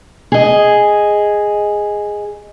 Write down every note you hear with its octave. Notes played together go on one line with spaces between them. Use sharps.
G#4 D#5